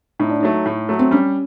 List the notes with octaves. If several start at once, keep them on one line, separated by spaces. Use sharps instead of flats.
A2 D#4
D4
F#3 A3 D#4
A2
F#3 A3
C4
G3 C#4